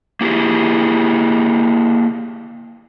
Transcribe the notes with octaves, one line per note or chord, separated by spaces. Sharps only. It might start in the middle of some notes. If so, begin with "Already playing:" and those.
A#3 E4 G4 G#4